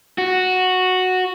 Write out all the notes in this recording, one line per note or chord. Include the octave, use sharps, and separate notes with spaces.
F#4